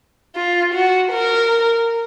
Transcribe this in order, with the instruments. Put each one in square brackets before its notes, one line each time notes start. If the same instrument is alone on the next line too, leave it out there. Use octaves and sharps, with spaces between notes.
[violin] F4
F#4
A#4